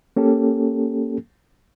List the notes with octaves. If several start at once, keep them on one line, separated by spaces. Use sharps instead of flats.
A#3 C#4 G4 A4